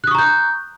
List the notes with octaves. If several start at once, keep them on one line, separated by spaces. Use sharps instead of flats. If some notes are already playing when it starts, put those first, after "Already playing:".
A#5 C#6 D#6 F#6 G6